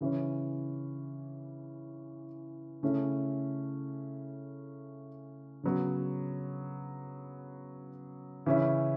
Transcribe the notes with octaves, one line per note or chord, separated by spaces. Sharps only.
C#3 E3 C#4
C#3 A3 C#4 E4
C#3 F#3 B3
C#3 E3 C#4 E4